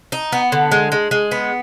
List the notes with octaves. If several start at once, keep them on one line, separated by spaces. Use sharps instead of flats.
D#4
B3
D3
G#3
G#3
G#3
B3